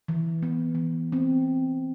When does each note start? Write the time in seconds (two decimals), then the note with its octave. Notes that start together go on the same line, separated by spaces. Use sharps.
0.08 E3
0.43 B3
0.75 E3
1.12 C4